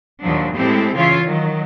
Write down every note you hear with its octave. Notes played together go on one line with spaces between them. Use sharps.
D#2 A#2 F3 F#3 D4
A2 G#3 C4 E4 G4 A4
C#3 E3 F4 C#5 E5 F5
D#3 F#3